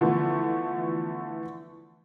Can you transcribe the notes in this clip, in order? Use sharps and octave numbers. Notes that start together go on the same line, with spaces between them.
D3 E3 F3 A3 B3